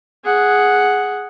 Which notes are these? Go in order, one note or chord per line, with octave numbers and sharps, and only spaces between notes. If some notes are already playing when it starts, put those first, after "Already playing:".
G#4 F#5